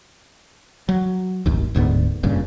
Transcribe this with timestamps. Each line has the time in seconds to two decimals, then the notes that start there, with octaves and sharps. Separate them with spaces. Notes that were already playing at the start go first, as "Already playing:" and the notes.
0.89 F#3
1.46 D1 G#1 D#2
1.74 D1 D2 G#2 B3
2.23 F1 G2 A#2 C#3